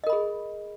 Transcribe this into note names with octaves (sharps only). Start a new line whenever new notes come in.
G#4 A#4 D#5 B5